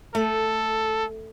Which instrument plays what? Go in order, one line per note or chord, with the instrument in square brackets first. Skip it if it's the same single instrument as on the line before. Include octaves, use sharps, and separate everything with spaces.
[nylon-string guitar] A3 [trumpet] A4